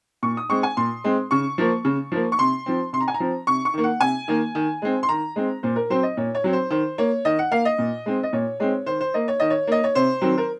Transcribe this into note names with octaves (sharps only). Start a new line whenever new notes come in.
A#2 C#6
D#6
G#3 C4 C#6
G#5
A#2 C6
G#3 C4
C#3 C#6
F3 A#3
C#3
F3 A#3
C#6
C3 C6
F3 C4
C3 C6
A#5
G#5
A#5
F3 C4
C3 C#6
C#6
D#3 A#3
F#5
C3 G#5
D#3 A#3
D#3
G#3 C4
C6
D#3 A#5
G#3 C4
A#2 C5
A#4
F#3 C4 C5
D#5
A#2 C#5
C#5
F#3 C4
C5
D#3 C5
A#3 C#5
D#3 D#5
F#5
A#3 F5
D#5
A#2
G#3 C4
D#5
A#2 C#5
G#3 C4 C#5
D#3 C5
C5
A#3 D#5
C#5
D#3 D#5
C#5
A#3 D#5
C#5
C3 C5
D#3 F#3 C4
A#4